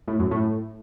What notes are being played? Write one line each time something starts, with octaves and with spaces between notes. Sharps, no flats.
A2
F#2
A2